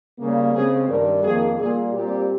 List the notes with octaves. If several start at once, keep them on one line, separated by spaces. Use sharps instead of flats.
C#3 G3 A#3
C#3 G#3 C4 G#4
G2 D#3 G3 A#4
F2 D#3 A#3 G#4
A#2 G3 A#3 G#4
A#2 G3 C4 G4